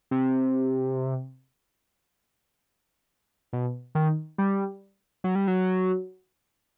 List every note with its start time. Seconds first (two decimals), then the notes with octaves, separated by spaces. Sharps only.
0.11 C3
3.53 B2
3.95 D#3
4.38 G3
5.24 F#3
5.35 G3
5.47 F#3